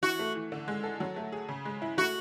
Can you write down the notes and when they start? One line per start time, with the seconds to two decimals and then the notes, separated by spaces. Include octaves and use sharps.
0.03 E3 F#4
0.19 A3
0.35 E3
0.52 D3
0.68 G#3
0.84 A4
1.00 F#3
1.16 A3
1.32 G#4
1.49 C#3
1.65 G#3
1.82 E4
1.97 A3 F#4